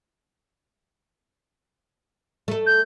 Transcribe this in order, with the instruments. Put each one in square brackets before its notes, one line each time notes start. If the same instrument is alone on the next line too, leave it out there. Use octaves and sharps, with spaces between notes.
[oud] A3 A4
[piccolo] G6